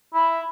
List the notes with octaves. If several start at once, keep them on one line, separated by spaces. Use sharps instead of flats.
E4